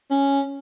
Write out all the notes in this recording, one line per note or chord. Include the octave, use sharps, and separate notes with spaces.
C#4